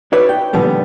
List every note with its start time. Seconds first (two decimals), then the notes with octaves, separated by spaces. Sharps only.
0.12 D#4 F#4 B4 C#5 D5 E5
0.29 G5
0.53 A#2 D3 D#3 F3 G3 B3